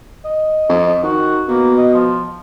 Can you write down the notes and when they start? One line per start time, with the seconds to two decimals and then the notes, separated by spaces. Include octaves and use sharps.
0.25 D#5
0.69 F2
1.03 D#3 F#4
1.48 B2 A#3
1.78 D#5
1.94 F3